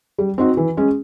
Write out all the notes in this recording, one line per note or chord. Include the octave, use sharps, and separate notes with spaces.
G3
C4 D#4 F#4
E3
G#3 C#4